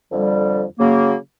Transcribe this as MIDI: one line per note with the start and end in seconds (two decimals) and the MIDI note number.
0.11 0.64 41
0.11 0.64 50
0.11 0.64 55
0.79 1.15 49
0.79 1.15 54
0.79 1.15 58